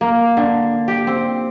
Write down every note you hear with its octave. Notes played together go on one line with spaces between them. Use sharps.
A#3
D3
G4
C4